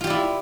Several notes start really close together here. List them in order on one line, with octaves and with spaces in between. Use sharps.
F4 G4 D5 E4